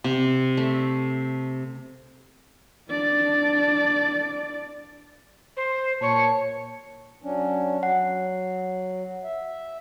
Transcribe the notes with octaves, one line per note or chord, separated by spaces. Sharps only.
C3
A3
D4 D5
C5
A#2 C#5 A5
F#3 C#4 D4
F#3 F#5
E5